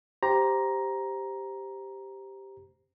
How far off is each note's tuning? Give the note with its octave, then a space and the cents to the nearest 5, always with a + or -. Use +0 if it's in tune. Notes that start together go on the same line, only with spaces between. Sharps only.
G4 +0 C5 +0 A#5 +10